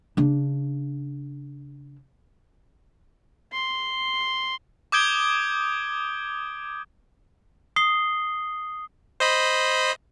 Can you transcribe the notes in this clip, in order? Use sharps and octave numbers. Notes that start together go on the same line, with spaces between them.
C#3 D4
C6
D6 D#6 G6 G#6 D7 G7
D#6 C7 G7
C5 D#5 B5